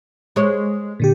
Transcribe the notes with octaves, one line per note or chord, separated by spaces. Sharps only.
G#3 C#5
A#2 D3 G4